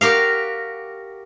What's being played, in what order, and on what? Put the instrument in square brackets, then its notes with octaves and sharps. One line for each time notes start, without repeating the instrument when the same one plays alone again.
[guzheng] F#4 G4 A#4 F5